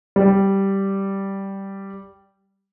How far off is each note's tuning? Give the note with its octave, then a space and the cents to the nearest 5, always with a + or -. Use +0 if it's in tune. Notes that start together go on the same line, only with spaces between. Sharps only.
G3 -5